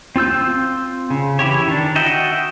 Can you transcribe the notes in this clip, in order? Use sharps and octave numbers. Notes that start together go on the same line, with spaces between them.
C4 F4 E6 G6
C#3
E3 E4 G4 C#5
D#3 D4
F#4 D#5 E5 G5